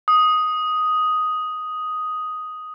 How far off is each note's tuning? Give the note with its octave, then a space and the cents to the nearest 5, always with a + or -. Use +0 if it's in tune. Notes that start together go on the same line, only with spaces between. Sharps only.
D#6 +5